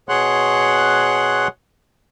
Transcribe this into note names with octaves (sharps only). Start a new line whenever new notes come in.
B2 G#4 C#5 F#5 C6 F#6